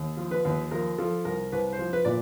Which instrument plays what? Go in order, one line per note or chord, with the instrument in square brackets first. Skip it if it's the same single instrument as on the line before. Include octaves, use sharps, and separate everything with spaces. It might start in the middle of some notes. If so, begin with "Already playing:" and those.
Already playing: [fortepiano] D#2
F3
B4
D#2
F3 A#4
F3 A4
C2 A#4
C2 B4
C5
F3
B4
A#2 D5